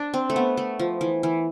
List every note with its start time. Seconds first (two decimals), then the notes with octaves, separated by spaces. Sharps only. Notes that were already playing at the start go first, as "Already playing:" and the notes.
Already playing: D4
0.14 C4
0.30 A3
0.36 B3
0.57 A3
0.79 F3
1.01 E3
1.23 E3